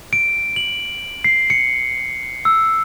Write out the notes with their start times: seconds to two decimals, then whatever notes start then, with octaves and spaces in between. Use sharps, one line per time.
0.13 D7
0.56 F#7
1.24 C7
1.50 C#7
2.45 E6